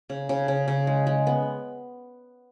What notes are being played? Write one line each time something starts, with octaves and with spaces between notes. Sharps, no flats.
C#3
C#3
C#3
C#3
G#3
G#3
B3